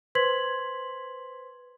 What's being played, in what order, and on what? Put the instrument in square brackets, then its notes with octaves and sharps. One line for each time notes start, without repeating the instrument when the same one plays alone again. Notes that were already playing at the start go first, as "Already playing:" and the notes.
[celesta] B4 C5 C6 G#6 B6 F#7